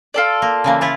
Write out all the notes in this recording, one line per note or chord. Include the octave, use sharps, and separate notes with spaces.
F4 A4 D5
A#3
C#3 E3 A#3
E4 F4 A5